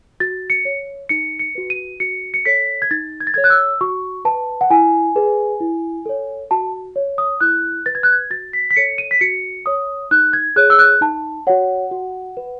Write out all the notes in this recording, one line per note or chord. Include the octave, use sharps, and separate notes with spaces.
F#4 A6
C#7
C#5
D#4 C#7
C#7
F#4 B4
D#7
F#4 C#7
C#7
A4 C#5 B6
G#6
D#4 A6
G#6
A6
A4 C#5 G#6
F#6
E6
F#4 C#6
B4 A5
F#5
E4 G#5
G#4 B4
E4
A4 C#5
F#4 A5
C#5
D#6
E4 F#6
B4 A6
G#6
F#6
G#6
F#4 A6
B6
B6
A4 C#5 C#7
D#7
B6
F#4 C#7
C#5 D#6
D#4 F#6
G#6
G#4 C#5 F#6
E6
F#6
D#4 A5
F#4 C#5 F#5
F#4
B4